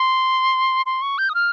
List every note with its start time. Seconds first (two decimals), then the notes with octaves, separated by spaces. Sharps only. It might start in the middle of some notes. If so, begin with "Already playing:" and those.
Already playing: C6
0.86 C6
1.02 C#6
1.18 G6
1.29 D#6
1.35 F6